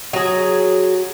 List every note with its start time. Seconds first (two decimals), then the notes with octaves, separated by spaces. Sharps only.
0.13 F#3 G#4